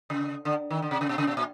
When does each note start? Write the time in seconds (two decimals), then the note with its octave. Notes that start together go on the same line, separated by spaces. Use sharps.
0.10 C#3
0.45 D3
0.71 D#3
0.82 D3
0.91 C3
1.01 C#3
1.09 B2
1.18 C#3
1.27 B2
1.37 A#2